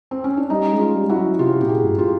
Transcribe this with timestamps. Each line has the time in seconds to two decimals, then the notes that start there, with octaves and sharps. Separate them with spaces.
0.11 C4
0.24 C#4
0.37 D4
0.50 G3 C#4 D#4
0.72 G#3
0.79 D#4 F4
0.95 G3
1.09 E4 F#4
1.17 F#3
1.39 C3 F4 G4
1.61 A#2 G4
1.69 F#4 G#4
1.83 G2
1.98 F4 G4